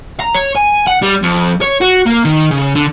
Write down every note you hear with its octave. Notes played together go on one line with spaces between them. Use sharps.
A#5
C#5
G#5
F#5
G3
F2
C#5
F#4
A#3
D#3
C#3
D3